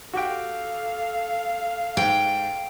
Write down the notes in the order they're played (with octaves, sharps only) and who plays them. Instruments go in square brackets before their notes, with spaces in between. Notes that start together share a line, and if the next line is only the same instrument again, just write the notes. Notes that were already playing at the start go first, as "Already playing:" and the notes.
[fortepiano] F#4 G4 G5 [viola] A4 F5
[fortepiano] G#2 [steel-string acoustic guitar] G5